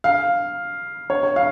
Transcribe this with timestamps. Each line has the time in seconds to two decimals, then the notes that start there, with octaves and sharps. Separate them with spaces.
0.04 F5
1.10 C#5
1.23 C#5
1.36 F5